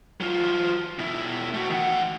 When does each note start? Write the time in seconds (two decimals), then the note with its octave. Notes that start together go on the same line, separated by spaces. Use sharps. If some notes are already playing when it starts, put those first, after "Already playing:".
0.21 F#3 F4
0.99 B2 E4
1.54 A3 F#4
1.70 D#3 F#5